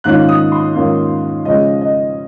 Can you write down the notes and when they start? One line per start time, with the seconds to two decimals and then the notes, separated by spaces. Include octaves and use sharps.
0.04 G#2 D#3 A#3 C#4 F4 F#6
0.29 D#6
0.52 C6
0.75 G#2 D#3 A#3 C#4 F4
1.45 C#3 F3 G#3 C#4 D#5
1.81 D#5